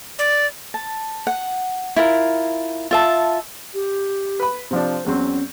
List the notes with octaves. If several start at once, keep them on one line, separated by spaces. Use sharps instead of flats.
D5
A5
F#5
E4 F4 A#4
F4 E5 A5
G4
B4 B5
C3 F3 D4 C5
E2 F#3 C4 C#4